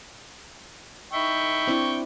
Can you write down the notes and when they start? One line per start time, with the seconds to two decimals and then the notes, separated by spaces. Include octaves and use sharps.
1.13 D#4 E5 G5 B5 C#6
1.67 C4 D4 E4